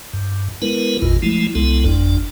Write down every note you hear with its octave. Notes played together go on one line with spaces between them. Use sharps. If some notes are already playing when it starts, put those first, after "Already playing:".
G2
G#3 B3 E4 A#4 B4
G#1 E2 A#2 F4
F3 G#3 A3 E4
C2 G#3 B3 E4 A4
G1 F2 D4